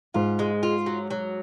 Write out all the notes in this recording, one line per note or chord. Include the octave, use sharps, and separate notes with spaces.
G#2 F4
G#3
F4
F#3
F#3